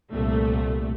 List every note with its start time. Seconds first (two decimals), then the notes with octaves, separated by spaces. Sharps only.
0.11 C2 A#2 A3